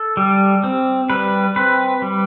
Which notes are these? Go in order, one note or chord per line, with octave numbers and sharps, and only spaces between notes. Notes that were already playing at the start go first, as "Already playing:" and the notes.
Already playing: A4
G3
C4
G3 B4
C4 B4
G3